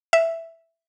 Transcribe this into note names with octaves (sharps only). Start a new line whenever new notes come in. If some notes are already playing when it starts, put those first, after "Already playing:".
E5